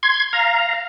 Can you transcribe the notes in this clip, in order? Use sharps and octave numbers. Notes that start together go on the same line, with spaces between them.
C6 G#6
F5 A#5